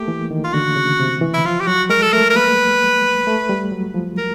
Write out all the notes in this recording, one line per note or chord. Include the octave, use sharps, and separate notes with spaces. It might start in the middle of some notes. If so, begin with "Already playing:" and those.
Already playing: A3 A#3 G4
E3
D#3
F4
D3 F#4
C#3
C3
E3
E4
F3 F4
G4
F#3 F#4
G#3 A#4
A4
A3 A#4
A#4
A#3 B4
A3
G3
F#3
F3
A#4